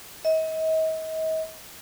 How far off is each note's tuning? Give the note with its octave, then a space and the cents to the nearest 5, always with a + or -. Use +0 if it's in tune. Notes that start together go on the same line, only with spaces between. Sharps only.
D#5 +40